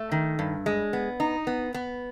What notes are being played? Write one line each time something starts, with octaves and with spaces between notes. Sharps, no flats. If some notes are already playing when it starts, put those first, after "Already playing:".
Already playing: A3
D#3
G2
G#3
B3
D#4
B3
B3